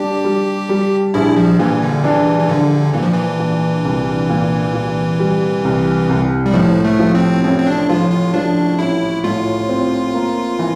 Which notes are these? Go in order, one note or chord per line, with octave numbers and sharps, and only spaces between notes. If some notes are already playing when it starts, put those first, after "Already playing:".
Already playing: G3 D4 G4
G3
G3
A#1 E4
F3
A#2 E3
D3
E3 D4
E3
A#1 D3
A#2 E3
F3
E3
A#2
C2
A#2
A#2
G3
C2
C2
G3
A2 F3
A3
F3
C4
A1 C4
C4
D4
F3 F4
F4
F3 D4
A1 E4
A2 F4
C4
A#3
E3